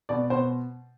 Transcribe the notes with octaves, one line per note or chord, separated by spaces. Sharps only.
B2 D5
B2 C5